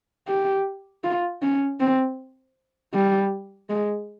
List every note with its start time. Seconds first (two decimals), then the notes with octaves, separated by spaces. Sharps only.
0.28 G4
1.04 F4
1.42 C#4
1.80 C4
2.94 G3
3.70 G#3